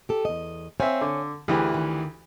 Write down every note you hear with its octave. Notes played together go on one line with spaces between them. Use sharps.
G4 A4
E2 D#5
C4 C#5 E5 F5 G#5
D3
D2 E3 G4 G#4
D#3